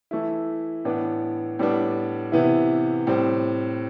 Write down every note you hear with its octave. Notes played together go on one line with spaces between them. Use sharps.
E3 A3 E4
A2 E3 B3 D4
A2 G3 B3 D4
C3 E3 B3 E4
A2 G3 C4